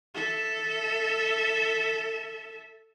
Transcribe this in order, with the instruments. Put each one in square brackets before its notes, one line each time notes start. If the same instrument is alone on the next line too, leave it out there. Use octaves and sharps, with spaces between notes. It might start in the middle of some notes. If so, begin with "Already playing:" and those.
[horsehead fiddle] A4 E5